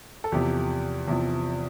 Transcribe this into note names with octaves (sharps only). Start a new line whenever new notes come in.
A4
E2 C3 F3 G4
E2 C3 F3